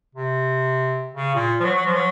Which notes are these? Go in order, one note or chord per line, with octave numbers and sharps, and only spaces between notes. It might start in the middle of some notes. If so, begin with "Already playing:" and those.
C3
C#3
A#2
F3
F#3
F#3
F3
F#3